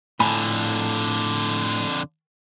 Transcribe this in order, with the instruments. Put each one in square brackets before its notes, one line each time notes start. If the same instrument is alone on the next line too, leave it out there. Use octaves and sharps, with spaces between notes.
[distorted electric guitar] F2 D3 [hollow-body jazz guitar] A2 G#5 B5